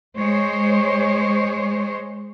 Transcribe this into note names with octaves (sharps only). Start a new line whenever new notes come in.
G#3 C5 C#5